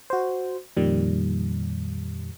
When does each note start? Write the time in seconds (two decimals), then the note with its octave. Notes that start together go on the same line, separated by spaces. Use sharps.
0.10 F#4 C5
0.77 F2 A#2 D#3 G3